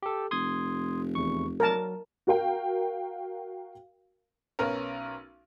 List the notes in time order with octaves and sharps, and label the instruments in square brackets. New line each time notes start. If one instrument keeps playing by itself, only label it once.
[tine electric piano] G4 A4
[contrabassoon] F1 [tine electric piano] C6 D#6 G#6
[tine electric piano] E2 C#6
[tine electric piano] F#3 [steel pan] A#4 A5
[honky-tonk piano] F#4 A#4 F5 G5
[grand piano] B1 B3 C#4 A#4